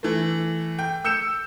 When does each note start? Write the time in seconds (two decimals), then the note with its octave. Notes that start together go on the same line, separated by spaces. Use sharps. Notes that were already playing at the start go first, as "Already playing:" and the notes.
0.03 E3 A3
0.79 G5
1.05 E6 G6 C#7 E7